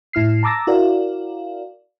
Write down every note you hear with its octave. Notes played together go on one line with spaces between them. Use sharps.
A2 E4 F6 C7
A5 A#5 D6 E6 A6 A#6
E4 F#4 A#4 D5 F5